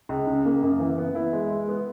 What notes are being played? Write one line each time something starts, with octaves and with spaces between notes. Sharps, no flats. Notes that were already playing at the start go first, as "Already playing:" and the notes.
C#2
C#3
A#3
F#2
E3
B3
E4
G#3
G#3
B3